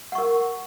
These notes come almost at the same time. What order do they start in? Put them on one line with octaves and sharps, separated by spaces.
F#5 C#6 A#4